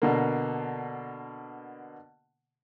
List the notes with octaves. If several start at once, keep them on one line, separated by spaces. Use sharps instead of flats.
B2 D3 A#3